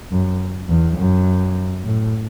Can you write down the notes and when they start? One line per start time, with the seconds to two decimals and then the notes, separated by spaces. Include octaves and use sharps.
0.11 F#2
0.69 E2
0.98 F#2
1.84 A2